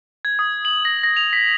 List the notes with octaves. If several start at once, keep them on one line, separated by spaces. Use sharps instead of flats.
G#6
D#6
F#7
A#6
A#6
F7
B6